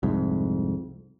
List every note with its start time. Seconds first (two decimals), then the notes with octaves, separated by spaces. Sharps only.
0.03 C2 F2 G#2